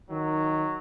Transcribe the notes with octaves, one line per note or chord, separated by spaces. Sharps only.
D#3 F#3